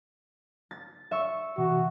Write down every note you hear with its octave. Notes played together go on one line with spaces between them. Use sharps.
A6
E5 C#6
C3 E3 F#4